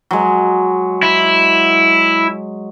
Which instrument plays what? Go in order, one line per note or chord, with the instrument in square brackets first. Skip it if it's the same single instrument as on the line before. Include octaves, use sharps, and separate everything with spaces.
[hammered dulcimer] F#3 G#3
[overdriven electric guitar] E4